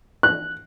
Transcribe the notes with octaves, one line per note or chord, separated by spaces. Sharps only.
F#6